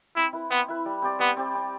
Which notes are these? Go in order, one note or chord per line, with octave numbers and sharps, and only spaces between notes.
C4 E4
E4 B4
B3 C4
E4 B4
G3
C4 G4 D5
G3 B3
C4 G4 D5
C4